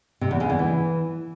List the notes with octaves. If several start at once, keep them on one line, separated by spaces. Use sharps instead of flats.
C3
E2
C#3
E2
E3